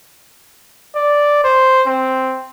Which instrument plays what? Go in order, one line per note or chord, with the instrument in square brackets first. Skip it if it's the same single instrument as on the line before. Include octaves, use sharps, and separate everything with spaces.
[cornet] D5
C5
C4